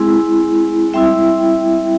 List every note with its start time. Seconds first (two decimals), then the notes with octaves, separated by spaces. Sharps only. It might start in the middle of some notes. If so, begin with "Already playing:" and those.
Already playing: G#3 C4 E4 G#4
0.94 G3 C4 E4 E5 G5